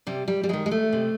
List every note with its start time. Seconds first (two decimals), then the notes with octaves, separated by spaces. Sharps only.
0.07 C3 G3
0.28 G3
0.43 G3
0.49 F#3 G#3
0.53 D#3
0.66 G#3
0.71 A3
0.92 C3